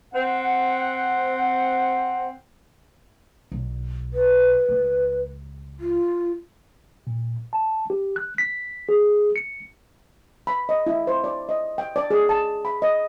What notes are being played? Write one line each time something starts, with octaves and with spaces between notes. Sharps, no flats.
C4 F#5
B1
B4
C#2
F4
A#2
A5
G4
F#6
B6
G#4
C#7
B5
D#5
E4
C5
D5
D#5
G5
D5
G#4
A5
B5
D#5